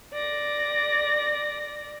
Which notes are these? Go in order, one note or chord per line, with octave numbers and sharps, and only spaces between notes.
D5 A#6